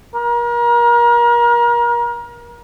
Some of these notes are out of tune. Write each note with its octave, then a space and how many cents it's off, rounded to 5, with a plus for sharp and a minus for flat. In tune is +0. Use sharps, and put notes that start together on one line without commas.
A#4 +35